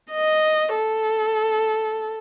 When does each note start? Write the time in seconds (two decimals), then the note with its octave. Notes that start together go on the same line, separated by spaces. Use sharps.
0.11 D#5
0.76 A4